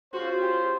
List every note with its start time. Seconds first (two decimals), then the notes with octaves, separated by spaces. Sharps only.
0.13 C#4 F4 F#4 G#4 C5
0.42 G4